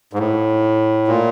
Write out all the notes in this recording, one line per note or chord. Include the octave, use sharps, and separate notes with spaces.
G#2
A2
A#2